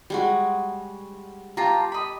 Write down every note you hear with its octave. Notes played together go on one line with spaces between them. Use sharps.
G3 G#3 F#4
F4 G4 A5 A#5
D#5 B5